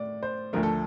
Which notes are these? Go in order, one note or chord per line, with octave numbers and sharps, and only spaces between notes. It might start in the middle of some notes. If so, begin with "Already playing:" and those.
Already playing: A2 D5
C5
D2 D3 F3 A3 A#4
A4